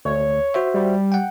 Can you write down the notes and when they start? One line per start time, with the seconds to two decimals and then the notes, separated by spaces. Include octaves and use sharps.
0.05 D2 C#5
0.54 F#4 C5 E5
0.74 G3
1.12 F#5 G5